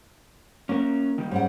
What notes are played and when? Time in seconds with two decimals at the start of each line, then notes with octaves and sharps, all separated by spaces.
0.69 A#3 C#4 A#4
1.18 D#3 G3
1.31 G#2 G3 C#4 F#5